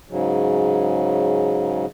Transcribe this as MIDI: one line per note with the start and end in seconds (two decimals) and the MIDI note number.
0.10 1.86 44
0.10 1.86 49
0.10 1.86 54